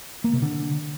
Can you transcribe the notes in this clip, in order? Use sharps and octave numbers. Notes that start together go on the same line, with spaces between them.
A#3
C3
D3